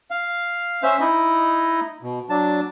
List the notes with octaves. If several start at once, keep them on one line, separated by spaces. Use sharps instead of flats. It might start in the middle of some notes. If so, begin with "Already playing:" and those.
F5
C#4 C5 E5
D#4 E4 D#5
B2
F#3 D4 A5